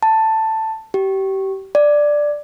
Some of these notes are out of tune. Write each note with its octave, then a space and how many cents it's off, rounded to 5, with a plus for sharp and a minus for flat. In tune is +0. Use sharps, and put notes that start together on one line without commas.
A5 +10
G4 -30
D5 +5